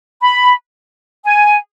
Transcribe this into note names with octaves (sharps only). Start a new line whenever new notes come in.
B5
G#5